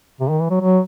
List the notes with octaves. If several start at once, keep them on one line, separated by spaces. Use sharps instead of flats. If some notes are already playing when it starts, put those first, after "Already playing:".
C3
D#3
E3
F#3
F#3